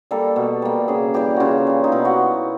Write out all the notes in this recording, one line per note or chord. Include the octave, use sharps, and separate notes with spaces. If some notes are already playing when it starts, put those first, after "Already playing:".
G3 A#3 A4
B2
G3 A#3
C#3 G#4
E3 G3 G4
C#3 F4 F#4
E3 G3
D#4
B2 E4
F#4